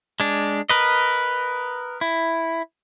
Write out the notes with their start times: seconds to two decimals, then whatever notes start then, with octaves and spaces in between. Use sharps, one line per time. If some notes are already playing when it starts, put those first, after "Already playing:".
0.20 G#3 D4
0.69 A#4 B4 D#5
2.01 E4